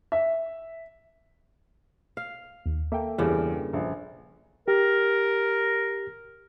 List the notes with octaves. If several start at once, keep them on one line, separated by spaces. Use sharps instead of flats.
E5
F5
D#2
A#3 A4 E5 G5
E2 G2 C#3
A#1
G4 A#4